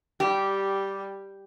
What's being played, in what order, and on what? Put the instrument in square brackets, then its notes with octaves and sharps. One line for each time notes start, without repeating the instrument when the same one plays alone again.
[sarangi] G3 [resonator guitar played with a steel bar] G4